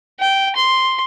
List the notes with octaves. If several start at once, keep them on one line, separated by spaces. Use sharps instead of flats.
G5
C6